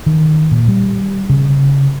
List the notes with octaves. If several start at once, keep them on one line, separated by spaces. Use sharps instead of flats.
D#3
A#2
G3
C#3